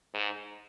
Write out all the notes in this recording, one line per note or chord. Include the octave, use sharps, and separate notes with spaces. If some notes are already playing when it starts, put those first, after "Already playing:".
G#2